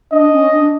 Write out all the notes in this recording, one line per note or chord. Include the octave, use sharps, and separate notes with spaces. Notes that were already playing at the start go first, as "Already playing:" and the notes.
D4 D#5
C#4
D4